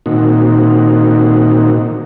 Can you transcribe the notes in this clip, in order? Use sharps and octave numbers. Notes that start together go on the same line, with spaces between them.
A#2 D#3 A#3 C4 D#4 F#4